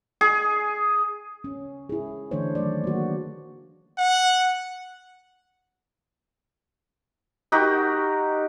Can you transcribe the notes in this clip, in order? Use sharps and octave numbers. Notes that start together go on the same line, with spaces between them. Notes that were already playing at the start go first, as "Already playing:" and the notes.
G#4
C#4
E4 G#4
D3 E3 A3 D4 C5 C#5
D#3 F#3 A3 D5
A#3 F#4
F#5
D#4 F#4 G4 A#4